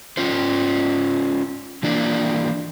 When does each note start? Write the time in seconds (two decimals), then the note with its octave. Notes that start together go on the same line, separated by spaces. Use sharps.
0.17 C#4 F4 C5
1.83 E3 A#3 D4